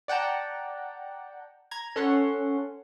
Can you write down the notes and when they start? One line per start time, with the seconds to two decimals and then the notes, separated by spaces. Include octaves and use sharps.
0.08 D5 F#5 G5 A5 A#5
1.71 A#5 G#6
1.96 C#4 A4 C#5 F#5 C6